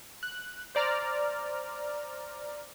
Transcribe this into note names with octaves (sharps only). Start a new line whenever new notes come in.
F#6
C5 D5 A#5 F6